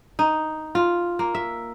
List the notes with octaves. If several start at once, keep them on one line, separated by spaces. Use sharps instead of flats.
D#4
F4
A#3
E5